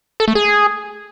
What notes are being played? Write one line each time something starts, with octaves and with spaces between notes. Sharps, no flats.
A4
A3
G#4